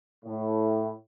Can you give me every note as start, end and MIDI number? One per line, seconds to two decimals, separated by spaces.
0.24 0.92 45